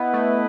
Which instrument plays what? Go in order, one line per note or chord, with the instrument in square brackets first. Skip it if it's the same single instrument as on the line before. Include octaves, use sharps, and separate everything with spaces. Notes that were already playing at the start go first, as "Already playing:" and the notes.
Already playing: [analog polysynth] B3 [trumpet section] E4 B4 D#5
[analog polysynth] A3